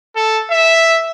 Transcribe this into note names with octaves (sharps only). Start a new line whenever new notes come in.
A4
E5